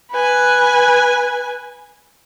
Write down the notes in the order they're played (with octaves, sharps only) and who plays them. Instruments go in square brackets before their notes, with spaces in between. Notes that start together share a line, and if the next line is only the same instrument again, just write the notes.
[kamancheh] B4 G#5